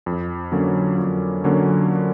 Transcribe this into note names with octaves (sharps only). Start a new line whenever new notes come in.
F2
D3 F#3 A#3 C#4
F2
D3 F#3 A#3 C#4